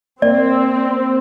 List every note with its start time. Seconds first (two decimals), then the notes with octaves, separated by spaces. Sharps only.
0.22 A#3 C4 D5